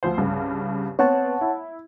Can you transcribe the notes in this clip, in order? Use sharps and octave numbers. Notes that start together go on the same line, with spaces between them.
D2 F3 C5
C2 G2 C#3
B3 C4 C#5 F#5 A5
E4